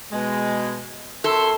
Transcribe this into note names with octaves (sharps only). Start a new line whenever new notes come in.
B2 G#3
F#2 A4 E5 C6